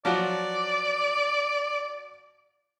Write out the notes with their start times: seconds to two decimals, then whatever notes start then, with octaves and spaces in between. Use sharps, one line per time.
0.05 F3 F#3 F#4 D5